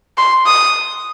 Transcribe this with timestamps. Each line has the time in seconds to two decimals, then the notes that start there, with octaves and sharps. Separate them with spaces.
0.17 C6
0.46 D#6